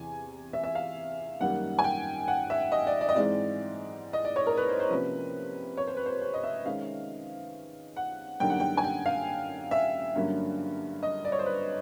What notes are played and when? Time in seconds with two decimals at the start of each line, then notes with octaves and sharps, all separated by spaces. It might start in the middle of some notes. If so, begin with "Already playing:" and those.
Already playing: E2 C3 E3 G#5
0.53 E5
0.64 E5
0.75 F5
1.41 F#2 D#3 G3 A#3 F#5
1.79 G#5
1.84 G5
2.28 F#5
2.50 E5
2.72 D#5
2.87 D5
3.01 D5
3.09 D#5
3.15 G#2 E3 G#3 C4 D5
4.13 D#5
4.25 D5
4.36 C#5
4.47 A#4
4.57 B4
4.69 C5
4.80 C5
4.90 C3 F3 A#3 C#4 B4
5.77 C#5
5.87 C5
5.97 B4
6.06 C5
6.21 C5
6.34 D#5
6.43 E5
6.65 D#3 G#3 C#4 F5
7.96 F#5
8.40 F#2 D3 G3 A#3 D#4 G5
8.50 F#5
8.60 G5
8.77 G#5
8.84 G5
9.06 F5
9.71 E5
10.16 G2 D3 F#3 A#3 C#4
11.03 D#5
11.25 D5
11.32 C#5
11.39 C5
11.46 B4